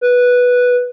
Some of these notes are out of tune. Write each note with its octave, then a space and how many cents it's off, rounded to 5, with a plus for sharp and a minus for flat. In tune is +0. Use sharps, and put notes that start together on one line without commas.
B4 -5